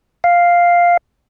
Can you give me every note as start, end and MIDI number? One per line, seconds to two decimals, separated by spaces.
0.24 0.97 77